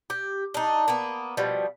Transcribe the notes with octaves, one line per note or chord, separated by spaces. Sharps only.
G4
D4 D#4
A#3 B3
B2 F3 G3